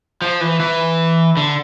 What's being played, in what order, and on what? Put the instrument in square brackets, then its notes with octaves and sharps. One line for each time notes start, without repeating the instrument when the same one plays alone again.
[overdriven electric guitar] F3
E3
E3
D3